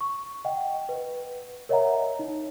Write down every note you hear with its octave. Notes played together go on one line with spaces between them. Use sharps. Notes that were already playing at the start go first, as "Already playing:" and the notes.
C#6
D#5 F#5 G5
B4
A#4 C#5 D#5 E5 F#5 A#5
D#4